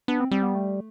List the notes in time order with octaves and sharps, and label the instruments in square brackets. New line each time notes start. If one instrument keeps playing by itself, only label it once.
[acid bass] B3 [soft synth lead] D4
[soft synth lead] C4
[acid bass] G3 [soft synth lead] C4
[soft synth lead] B3
A3